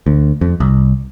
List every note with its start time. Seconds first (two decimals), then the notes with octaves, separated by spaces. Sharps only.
0.06 D2
0.41 F2
0.60 C2